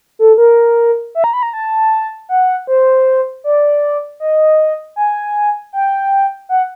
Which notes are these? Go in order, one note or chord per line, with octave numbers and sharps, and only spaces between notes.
A4
A#4
E5
A#5
B5
A#5
A5
F#5
C5
D5
D#5
G#5
G5
F#5